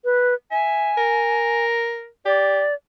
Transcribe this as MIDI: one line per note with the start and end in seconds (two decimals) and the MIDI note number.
0.05 0.34 71
0.52 0.93 76
0.52 1.65 80
0.98 2.08 70
2.26 2.64 67
2.26 2.74 74